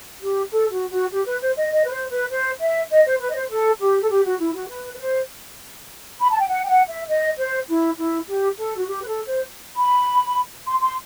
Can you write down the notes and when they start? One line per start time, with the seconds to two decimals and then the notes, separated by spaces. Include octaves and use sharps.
0.21 G4
0.51 A4
0.71 F#4
0.91 F#4
1.11 G4
1.25 B4
1.41 C5
1.55 D#5
1.70 D#5
1.84 B4
1.90 C5
2.10 B4
2.30 C5
2.60 E5
2.90 D#5
3.05 C5
3.20 B4
3.30 D#5
3.35 C5
3.49 A4
3.79 G4
4.01 A4
4.09 G4
4.24 F#4
4.39 E4
4.54 F#4
4.69 B4
4.94 B4
4.98 C5
6.20 B5
6.30 A5
6.39 G5
6.48 F#5
6.63 G5
6.68 F#5
6.88 E5
7.08 D#5
7.38 C5
7.68 E4
7.97 E4
8.27 G4
8.56 A4
8.76 F#4
8.87 G4
9.02 B4
9.07 A4
9.26 C5
9.76 B5
10.66 C6
10.80 C6